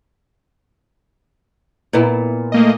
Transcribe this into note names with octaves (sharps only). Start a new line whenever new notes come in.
A#2 B3 E4
A3 A#3 D#5